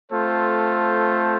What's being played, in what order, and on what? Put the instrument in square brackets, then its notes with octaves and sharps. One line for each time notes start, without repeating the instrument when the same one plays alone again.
[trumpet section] A3 C4 F4 A4 C5